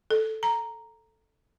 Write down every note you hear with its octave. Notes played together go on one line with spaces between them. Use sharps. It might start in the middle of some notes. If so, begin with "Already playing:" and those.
A4
A#5